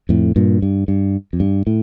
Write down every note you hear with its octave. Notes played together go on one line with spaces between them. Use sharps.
F2 A2
G2 A#2
G2
G2
F2
G2
A2